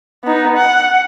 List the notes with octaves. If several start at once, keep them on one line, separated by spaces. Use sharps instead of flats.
B3 D#4
F#5